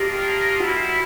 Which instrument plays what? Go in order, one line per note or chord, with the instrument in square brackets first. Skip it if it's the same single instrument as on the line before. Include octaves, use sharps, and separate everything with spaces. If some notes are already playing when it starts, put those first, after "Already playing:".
Already playing: [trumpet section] A#3 D4 F4 A#4 D#5 [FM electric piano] G4
[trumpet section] G3 C4 E4 [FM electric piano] F#4